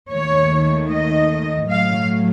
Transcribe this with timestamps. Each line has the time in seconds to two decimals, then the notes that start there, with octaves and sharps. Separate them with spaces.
0.10 D#2 D#3 A3 C#5
0.90 D#5
1.70 A2 F#3 A3 F5